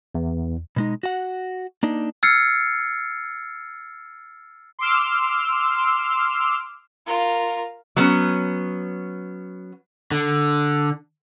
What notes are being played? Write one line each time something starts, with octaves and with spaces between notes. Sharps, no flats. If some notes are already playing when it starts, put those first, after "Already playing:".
E2
B2 G#3 D#4
F#4 F#5
A#3 D4 D#4
E6 F6 G#6 A6 C7 C#7
C6 D6 E6 F6
F4 A#4
F#3 B3 C#4
D3